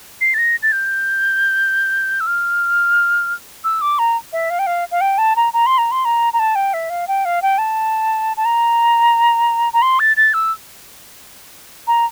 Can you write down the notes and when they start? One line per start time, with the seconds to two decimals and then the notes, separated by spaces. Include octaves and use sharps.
0.21 C7
0.34 A6
0.38 A#6
0.62 A6
0.72 G6
2.20 E6
2.27 F6
3.64 E6
3.81 D6
3.99 A#5
4.32 E5
4.50 F5
4.59 G5
4.66 F5
4.91 F5
5.01 G5
5.18 A5
5.36 A#5
5.53 A#5
5.66 C6
5.78 A#5
5.91 C6
6.05 A#5
6.33 A#5
6.39 A5
6.55 G5
6.73 E5
6.90 F5
7.08 G5
7.25 F5
7.42 G5
7.58 A5
8.37 A5
8.45 A#5
9.73 A#5
9.82 C6
9.99 A6
10.16 A6
10.33 E6
11.87 A#5